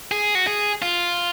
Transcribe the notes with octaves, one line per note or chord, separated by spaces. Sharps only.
G#4
F#4
G#4
F4